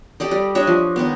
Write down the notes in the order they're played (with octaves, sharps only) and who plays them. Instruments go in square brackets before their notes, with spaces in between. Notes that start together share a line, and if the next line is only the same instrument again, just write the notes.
[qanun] G4 A4 D5 D#5
G3
D4 C#5 D#5 E5
F3
D#3 G#3 B3